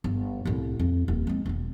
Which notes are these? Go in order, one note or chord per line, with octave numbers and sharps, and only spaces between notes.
G1
C2 A2
F2
D#1
G#3 C4
E1 B2